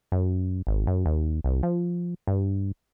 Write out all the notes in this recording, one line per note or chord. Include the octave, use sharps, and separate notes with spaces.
F#2
G#1
F#2
D#2
C2
F3
G2